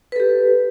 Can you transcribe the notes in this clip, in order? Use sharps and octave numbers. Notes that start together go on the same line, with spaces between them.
G4 A4 B4